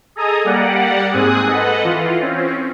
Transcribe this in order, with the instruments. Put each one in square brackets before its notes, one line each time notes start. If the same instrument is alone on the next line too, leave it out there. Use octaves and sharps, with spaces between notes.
[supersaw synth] G#4 A4 D#5 G#5 A#5 D#6
G3 A#3 G4 D5 F#5
G#2 C4 G#4 G#5 D#6 F#6
A4 B4 D#5 F#5
E3 F4
C4 C#4